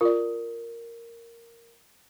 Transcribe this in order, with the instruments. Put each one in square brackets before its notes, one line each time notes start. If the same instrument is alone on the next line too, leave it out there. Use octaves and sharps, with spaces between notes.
[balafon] F4 D5 [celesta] A#4